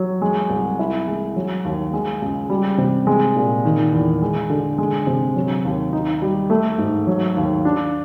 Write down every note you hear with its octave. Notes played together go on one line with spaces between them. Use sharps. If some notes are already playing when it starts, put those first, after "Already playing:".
Already playing: F#3
G#3
C2
E4
G#3
F#3
D#2
G#3
C#2
G3
C3
G#3
A#2
D#3
E2
G#3
D3
G#3
C3
F#3
D#2
D#4
G3
A3
G#2
F#3
D#2
D4